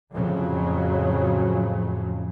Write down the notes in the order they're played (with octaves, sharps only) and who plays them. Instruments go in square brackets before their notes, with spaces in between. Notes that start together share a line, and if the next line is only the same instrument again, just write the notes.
[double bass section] F2 A2 C#3 F3 F#3